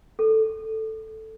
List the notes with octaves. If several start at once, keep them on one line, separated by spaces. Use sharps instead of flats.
A4